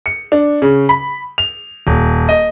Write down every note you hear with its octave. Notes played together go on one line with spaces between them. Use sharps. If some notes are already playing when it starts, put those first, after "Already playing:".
C#7
D4
C#3
B5
F7
D#1
D#5